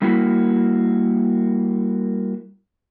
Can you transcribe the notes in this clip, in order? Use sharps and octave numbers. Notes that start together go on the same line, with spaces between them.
G3 A#3 E4 F#4